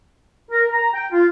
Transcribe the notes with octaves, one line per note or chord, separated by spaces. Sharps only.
A#4
A#5
G5
F4